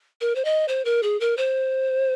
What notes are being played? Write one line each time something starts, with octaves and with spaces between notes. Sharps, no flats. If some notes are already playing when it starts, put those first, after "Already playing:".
A#4
C5
D#5
C5
A#4
G#4
A#4
C5